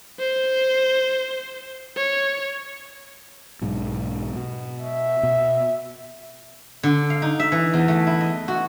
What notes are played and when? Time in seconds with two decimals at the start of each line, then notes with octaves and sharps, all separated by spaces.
0.19 C5
1.97 C#5
3.61 B1 G#2 B2
4.35 B2
4.84 E5
5.23 B2
6.83 D3
7.10 F5
7.22 D#4
7.40 E5
7.52 E3
7.74 E2
7.88 A3
8.07 E4
8.21 D#5
8.48 F#4